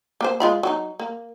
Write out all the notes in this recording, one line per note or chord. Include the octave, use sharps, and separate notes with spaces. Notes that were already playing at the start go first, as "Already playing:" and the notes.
A#3 C5
G#3 F4 B5
F#3 D#4
A#3